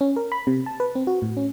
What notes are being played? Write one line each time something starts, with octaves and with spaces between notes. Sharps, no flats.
C#4
A#4
B5
C3
A5
B4
C4
F#4
A2
C#4